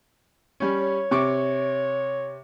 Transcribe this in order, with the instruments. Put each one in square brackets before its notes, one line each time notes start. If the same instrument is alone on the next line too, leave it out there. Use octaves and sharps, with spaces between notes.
[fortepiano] G3 C#4
[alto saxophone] C#5
[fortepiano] C3 C#6 D6